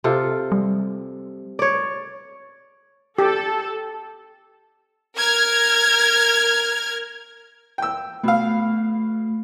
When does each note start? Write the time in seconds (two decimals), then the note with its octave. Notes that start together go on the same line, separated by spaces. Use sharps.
0.04 C3 F4 A4
0.52 G3
1.59 C#5 D5
3.18 G4 A4
5.18 A#4 F6 G#6
7.78 G5 E6
8.23 B2 A3 F5